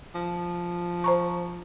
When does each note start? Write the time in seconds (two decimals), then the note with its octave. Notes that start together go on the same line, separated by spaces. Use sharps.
0.15 F3
1.04 C5 A#5 C#6